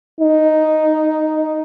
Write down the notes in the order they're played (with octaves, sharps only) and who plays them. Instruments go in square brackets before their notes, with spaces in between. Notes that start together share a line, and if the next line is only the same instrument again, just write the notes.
[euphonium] D#4